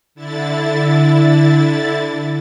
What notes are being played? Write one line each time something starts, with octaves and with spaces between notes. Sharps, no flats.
D3 E4 A6